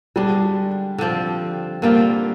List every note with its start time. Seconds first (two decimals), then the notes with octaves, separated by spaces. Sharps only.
0.16 D3 G3 G#3 D4
0.98 D3 F3 C4
1.82 D3 G3 A#3 C4 F4